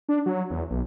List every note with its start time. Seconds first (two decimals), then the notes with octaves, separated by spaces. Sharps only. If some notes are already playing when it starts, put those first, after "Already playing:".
0.09 D4
0.26 F#3
0.51 E2
0.71 B1